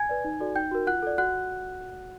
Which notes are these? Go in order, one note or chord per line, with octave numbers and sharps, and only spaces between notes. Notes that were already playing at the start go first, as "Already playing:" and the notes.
Already playing: G#5 G#6
B4 D5
D#4
F#4 A4 D5
D#4 G5 G6
F#4 A#4
F4 F#5 F#6
A4 D5
F#4 F#5 F#6